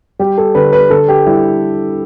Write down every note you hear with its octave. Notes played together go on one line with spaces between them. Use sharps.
G3 G4
A4
D3 B4
B4
D3 A4
G4
G3 E4